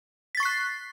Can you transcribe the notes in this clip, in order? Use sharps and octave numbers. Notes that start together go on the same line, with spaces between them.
C#6 F#6 A6 B6 C7